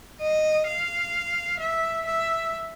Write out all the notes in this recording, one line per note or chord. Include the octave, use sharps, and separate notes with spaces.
D#5
F5
E5
E5